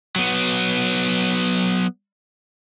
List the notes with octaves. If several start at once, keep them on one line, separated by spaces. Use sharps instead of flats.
F#3 B3